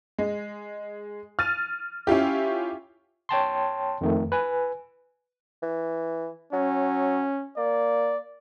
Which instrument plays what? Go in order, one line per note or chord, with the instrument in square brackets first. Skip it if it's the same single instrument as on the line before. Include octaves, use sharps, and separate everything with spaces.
[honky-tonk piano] G#3
F6 A6 D#7
C#4 E4 F4 G4
[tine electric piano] C#5 G5 A5 C6
F2 D#3 A3
B4 G#5
[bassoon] E3
[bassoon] F#3 [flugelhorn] C#4
[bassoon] A#3 [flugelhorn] D5